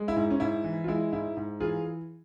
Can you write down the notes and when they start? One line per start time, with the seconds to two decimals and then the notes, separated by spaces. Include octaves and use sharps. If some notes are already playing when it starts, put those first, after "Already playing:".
Already playing: G#3
0.08 E4
0.16 G#2
0.30 C#4
0.40 G#2 E4
0.64 E3
0.84 F4
0.88 G#3 E4
1.12 G#2 E4
1.37 G#2
1.60 E3 F4 G#4